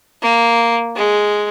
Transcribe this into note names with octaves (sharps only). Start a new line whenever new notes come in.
A#3
G#3